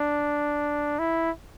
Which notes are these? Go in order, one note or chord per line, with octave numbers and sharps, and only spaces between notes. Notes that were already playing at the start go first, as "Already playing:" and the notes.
Already playing: D4
E4